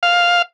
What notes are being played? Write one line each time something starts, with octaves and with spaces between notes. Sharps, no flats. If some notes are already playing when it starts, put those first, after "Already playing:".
F5